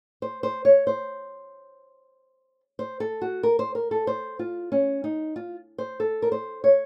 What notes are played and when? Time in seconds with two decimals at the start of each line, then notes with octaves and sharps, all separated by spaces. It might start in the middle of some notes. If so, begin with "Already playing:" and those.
0.22 C5
0.43 C5
0.65 C#5
0.87 C5
2.79 C5
3.00 A4
3.22 F#4
3.43 A#4
3.59 C5
3.75 A#4
3.91 A4
4.07 C5
4.39 F4
4.72 C#4
5.04 D#4
5.36 F4
5.78 C5
6.00 A4
6.22 A#4
6.32 C5
6.64 C#5